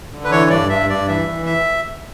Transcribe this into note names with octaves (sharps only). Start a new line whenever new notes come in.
D3
B4
E3 C#5
G2 D5
G2 E5
G2 D5
E3 E5
E3
E5